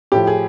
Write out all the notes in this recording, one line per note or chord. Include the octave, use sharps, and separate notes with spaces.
A2 F3 G4
G#4